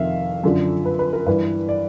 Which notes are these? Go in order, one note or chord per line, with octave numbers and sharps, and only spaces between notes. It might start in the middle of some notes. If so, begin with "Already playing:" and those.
Already playing: F2 C3 D#3 E5 F5
F#2 D3 F3
B4
B4
A#4
G2 E3 B4
D5